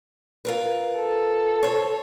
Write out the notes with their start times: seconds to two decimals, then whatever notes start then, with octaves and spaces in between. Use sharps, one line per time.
0.45 F4 A#4 B4
0.97 A4
1.63 C5 C#5